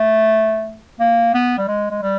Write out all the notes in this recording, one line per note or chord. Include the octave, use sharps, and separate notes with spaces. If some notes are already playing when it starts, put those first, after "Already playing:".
Already playing: A3
A#3
B3
G3
G#3
G#3
G3